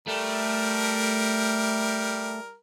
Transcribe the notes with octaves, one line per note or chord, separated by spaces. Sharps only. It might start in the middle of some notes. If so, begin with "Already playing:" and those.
G3 A3 A#4